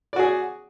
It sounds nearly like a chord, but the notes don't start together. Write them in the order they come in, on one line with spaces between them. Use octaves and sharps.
D5 F#4 G#4